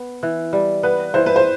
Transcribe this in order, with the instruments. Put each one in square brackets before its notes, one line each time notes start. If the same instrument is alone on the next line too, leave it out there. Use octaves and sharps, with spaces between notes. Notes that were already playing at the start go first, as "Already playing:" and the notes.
Already playing: [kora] B3
E3
G3
[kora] B3 [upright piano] B4
[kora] E3 [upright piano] C5
[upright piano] B4
C5